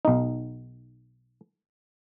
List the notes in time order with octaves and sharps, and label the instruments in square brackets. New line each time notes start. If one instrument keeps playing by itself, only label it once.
[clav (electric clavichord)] B1 D#4